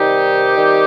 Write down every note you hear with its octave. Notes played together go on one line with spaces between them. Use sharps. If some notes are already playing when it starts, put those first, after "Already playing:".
Already playing: C3 D#3 G3 D#4 G4
C3 D#3 G3